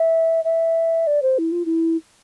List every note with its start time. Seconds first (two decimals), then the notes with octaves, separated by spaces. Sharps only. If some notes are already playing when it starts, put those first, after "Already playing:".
Already playing: E5
0.44 E5
1.07 D5
1.22 C5
1.38 E4
1.52 F4
1.66 E4